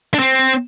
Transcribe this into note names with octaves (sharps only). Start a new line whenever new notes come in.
D4
C4